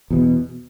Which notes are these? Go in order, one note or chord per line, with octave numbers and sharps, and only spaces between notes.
E2 B2